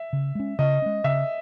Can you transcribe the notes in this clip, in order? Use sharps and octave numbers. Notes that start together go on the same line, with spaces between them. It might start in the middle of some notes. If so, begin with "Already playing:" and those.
Already playing: E5
C#3
G#3 C#4
C#3 D#5
G#3 C#4
C#3 E5